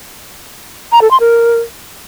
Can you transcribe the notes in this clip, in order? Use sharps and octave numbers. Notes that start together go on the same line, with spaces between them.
A#5
A4
C6
A#4